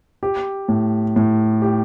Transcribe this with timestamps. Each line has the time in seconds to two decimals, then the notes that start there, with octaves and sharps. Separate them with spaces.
0.23 G4
0.68 A2
1.16 A2
1.62 G4